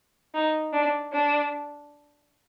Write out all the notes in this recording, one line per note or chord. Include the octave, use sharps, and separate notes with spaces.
D#4
D4
D4